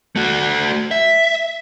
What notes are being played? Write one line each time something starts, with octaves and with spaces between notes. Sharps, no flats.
A3 F#4
E5